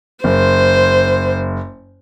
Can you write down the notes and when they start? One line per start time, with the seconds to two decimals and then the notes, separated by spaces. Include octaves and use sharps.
0.24 F#1 C5